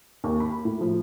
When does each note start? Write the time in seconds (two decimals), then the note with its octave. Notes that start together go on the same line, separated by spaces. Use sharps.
0.24 D#2
0.40 B5
0.65 A2
0.81 F3